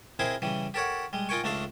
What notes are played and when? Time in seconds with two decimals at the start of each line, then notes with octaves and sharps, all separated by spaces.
0.19 C4 D#4 E4 G#4 A#4 C5
0.42 C#3 E3 G3
0.74 G4 A4 A#4 C#5 F#5
1.13 G3 G#3
1.29 D#4 F4 A#4 G5 G#5 C#6
1.44 C#2 A3 D4 D#4 A4 F5